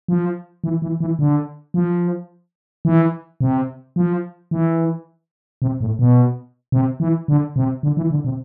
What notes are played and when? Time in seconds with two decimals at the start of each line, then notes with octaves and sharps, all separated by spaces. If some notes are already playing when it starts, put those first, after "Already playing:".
0.08 F3
0.64 E3
0.82 E3
1.00 E3
1.19 D3
1.74 F3
2.85 E3
3.41 C3
3.96 F3
4.51 E3
5.62 C3
5.81 A2
5.99 B2
6.72 C3
7.00 E3
7.28 D3
7.56 C3
7.83 D3
7.97 E3
8.11 D3
8.25 C3